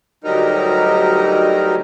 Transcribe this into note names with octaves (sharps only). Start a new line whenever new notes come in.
D2 F#3 G3 D#4 A#4